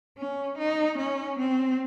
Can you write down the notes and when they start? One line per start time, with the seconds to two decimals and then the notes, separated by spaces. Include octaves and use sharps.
0.18 C#4
0.58 D#4
0.98 C#4
1.39 C4